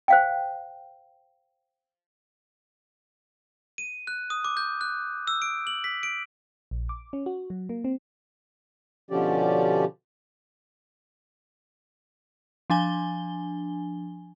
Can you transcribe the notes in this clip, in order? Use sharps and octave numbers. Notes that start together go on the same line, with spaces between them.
C5 F5 G5
D#7
F#6
D#6
D6
G6
F#6
E6
D7
F#7
B6
D7
A#1
D6
C#4
F#4
F#3
A#3
C4
B2 D3 F3 C#4 G4 D5
F3 D4 G#5 G7